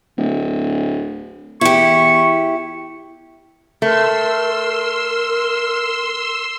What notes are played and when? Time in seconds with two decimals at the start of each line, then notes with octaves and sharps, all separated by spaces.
0.17 D1
1.61 E2 E4 G4 C#6
3.82 A3 A#4 C6 E6